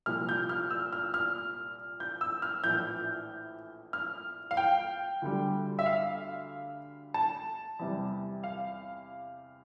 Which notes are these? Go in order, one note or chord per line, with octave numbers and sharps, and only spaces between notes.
C2 A#2 F3 F6
G6
F6
E6
F6
F6
G6
E6
F6
A#1 A2 E3 G6
F6
F5
G5
D2 D3 G3
E5
F5
A5
E2 C3 G3
F5